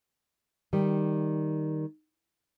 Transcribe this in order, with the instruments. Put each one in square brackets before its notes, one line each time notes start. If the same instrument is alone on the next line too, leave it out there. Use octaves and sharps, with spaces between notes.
[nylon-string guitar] D#3 G3